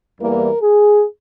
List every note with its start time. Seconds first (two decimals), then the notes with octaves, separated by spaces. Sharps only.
0.21 E2 E3 G3 A#3 A#4
0.62 G#4